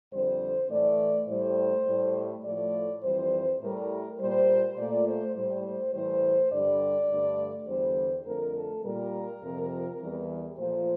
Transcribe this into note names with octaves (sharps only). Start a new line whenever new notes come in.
F2 D3 G3 C5
A2 E3 A3 D5
A2 G3 C5
A2 G3
A2 F3 A3 D5
F2 E3 G3 C5
A2 G3 A#4
A#2 G3 C5
A#2 A3 D5
C5
A2 G3 C5
C5
A2 E3 G3 C5
G2 D3 G3 D5
G2 D3 A3
E2 D3 G3 C5
F2 D3 A3 A#4
A4
A#2 G3 A#4
F2 C3 F3
E2 E3 G3
A#2 F3 A3 C5